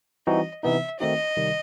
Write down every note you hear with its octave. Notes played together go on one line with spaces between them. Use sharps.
E3 G3 C4 D#4 F#4 D#5
C3 E3 B3 D#4 E5
D#3 A3 C4 D#4 F#4 D#5
C3 D#3 G3